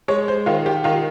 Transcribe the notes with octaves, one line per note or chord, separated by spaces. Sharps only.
G#3 C#5
C5
D#3 F4
G4
D#3 F4